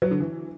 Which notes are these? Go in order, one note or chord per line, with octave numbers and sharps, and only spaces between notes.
F#3
D3
E3